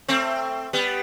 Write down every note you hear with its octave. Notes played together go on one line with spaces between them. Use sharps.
A3 C4
G3 B3